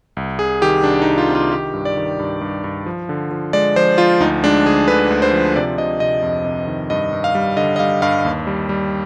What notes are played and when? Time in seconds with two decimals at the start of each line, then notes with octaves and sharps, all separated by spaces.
0.17 C2
0.39 C2 G#4
0.62 D#3 G4
0.84 C2 D4
1.02 D#4
1.06 C2
1.18 F4
1.29 C3
1.35 F4
1.52 D#3 G4
1.73 G2
1.85 D5
1.97 D#3
2.19 G2
2.41 G2
2.64 G2
2.86 F3
3.09 D3
3.31 F3
3.53 G#3 D5
3.76 F3 C5
3.98 F3 F4
4.20 D2 D#4
4.44 G#3 D4
4.65 D2 G#4
4.88 D3 B4
5.10 D2
5.22 C5
5.32 F3
5.56 C3 D5
5.78 C3 D#5
6.00 C3 D#5
6.22 F2
6.45 C3
6.67 D#3
6.90 G2 D#5
7.13 G2
7.24 F5
7.35 G3
7.57 D3 D#5
7.76 D#5
7.79 G3 F5
8.02 G2 F5
8.25 D#2
8.47 G3
8.69 G3